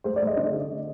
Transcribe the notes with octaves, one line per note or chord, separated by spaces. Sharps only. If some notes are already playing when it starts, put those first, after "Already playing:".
A3 C5
D5
A3
D#5
D3